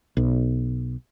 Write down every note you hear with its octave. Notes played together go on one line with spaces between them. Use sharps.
B1